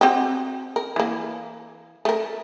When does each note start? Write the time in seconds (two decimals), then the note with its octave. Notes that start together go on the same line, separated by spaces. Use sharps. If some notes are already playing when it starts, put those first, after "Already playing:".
0.01 C4 F#4 G4
0.76 A#4
0.96 E3 A#3
2.05 A3 A#4